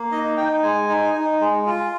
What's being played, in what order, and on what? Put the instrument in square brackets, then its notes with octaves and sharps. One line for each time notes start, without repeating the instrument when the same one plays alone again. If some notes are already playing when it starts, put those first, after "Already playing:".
Already playing: [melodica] A#3
D#4 D#5
D#4 G5
G#3 G#5
D#4
D#4
G#3
F4